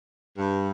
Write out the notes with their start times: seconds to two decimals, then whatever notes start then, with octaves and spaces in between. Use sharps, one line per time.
0.37 G2